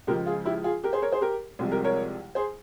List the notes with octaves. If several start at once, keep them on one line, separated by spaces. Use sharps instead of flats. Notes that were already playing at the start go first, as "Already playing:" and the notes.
C#2 C#3 F3 G#3 G4 A#4
F4 G#4
E4 G4
F4 G#4
G4 A#4
G#4 C5
A#4 C#5
G#4 C5
G4 A#4
C2 C3 F3 G#3
G4 A#4
A#4 C#5
G#4 C5